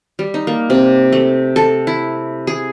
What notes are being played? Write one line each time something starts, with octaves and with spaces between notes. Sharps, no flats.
G3
D#4
A#3
C3
A3
A4
E4
G#4